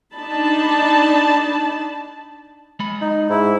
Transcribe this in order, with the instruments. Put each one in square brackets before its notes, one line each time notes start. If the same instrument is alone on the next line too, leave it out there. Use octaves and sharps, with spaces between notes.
[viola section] D4 D#4 A5 B5
[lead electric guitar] G#3 B5
[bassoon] D#4
[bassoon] G#2 [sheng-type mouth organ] E4